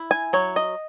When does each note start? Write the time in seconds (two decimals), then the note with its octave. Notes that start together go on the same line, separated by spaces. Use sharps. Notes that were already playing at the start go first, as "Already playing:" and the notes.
Already playing: E4
0.11 G#5
0.33 F#3 C#5
0.56 D#5